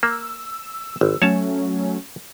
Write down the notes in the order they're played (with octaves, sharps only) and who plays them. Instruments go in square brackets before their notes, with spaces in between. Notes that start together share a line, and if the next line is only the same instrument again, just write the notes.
[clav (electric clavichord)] A#3 [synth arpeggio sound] E6
[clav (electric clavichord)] G#1
[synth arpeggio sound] F#3 A3 C#4 [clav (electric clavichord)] C#5 A5